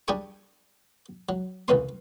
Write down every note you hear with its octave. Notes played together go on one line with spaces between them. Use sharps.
G3 D4 G4 G#4 G#5 C#6
F#3
C2 C#3 E3 C#4 C6